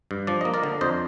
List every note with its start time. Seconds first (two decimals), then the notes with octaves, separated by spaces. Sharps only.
0.11 G2
0.27 F3 D5
0.41 A#3 D#5
0.54 A#4 D5
0.63 D3
0.81 F2 C5 D#5